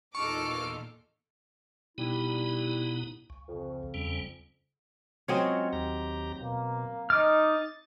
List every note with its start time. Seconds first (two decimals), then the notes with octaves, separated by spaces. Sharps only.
0.15 E2 A#2 D#4 F4 A4 C#6 D6 F6
1.98 B2 G3 B3 D#4 E4
3.30 C#2
3.47 F2 C#3
3.94 E2 G3 C#4
5.28 F#3 G#3 C4 C#4 F4 D#5
5.73 D#2 G4 A#5
6.42 B2 A#3
7.10 D#4 D#5 D6 F6 A6